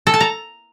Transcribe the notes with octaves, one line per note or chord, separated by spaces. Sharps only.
A4
A5
A#5